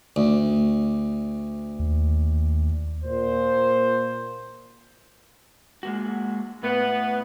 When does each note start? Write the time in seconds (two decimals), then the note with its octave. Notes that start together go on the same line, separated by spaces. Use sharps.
0.16 D2
1.79 D#2
3.04 A#2 C5
5.83 G#3 A#3 F#4
6.63 A2 B3